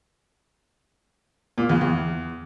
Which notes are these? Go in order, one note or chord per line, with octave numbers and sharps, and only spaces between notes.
A#2
E2
E2